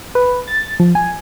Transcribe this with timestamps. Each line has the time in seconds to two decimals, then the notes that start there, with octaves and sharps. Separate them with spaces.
0.15 B4
0.48 A6
0.80 F3
0.95 G#5